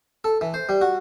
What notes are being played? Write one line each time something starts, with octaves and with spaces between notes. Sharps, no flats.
A4
E3
C5
G3
F#4